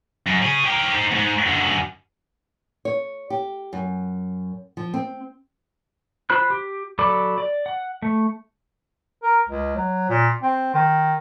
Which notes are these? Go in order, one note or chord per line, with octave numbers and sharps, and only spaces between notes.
F#2
C#4 G#4
G4 A#4
D#4 C5
E2 G#2
F#2 D3
C#5
G4
F#2
F3
C4
F4 C5 B5 F#6
G4
F#3 A4 D5 B5 D6
D5
F#5
A3
A#4
C#2
F#3
A#2
C4
D#3